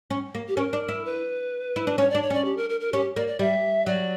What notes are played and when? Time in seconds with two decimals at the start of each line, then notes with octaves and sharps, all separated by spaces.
0.10 C#4
0.35 A#3
0.48 G4
0.57 C#4 A#4
0.73 D4
0.88 E4
1.05 B4
1.76 E4
1.87 D4
1.98 C#4 C#5
2.10 D4 D5
2.22 C#5
2.30 C#4 D5
2.45 G4
2.57 A#4
2.70 A#4
2.80 A#4
2.93 C#4 G4
3.16 A#3 D5
3.27 D5
3.39 G3 E5
3.86 F#3 D5